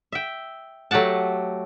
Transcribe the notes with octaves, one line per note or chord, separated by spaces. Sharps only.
E5 G5
F#3 A3 G4 F#5 A5